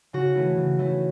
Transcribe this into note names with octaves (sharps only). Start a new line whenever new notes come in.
C#3 F#4
E3 A3 E4
C#3
E3 A3 E4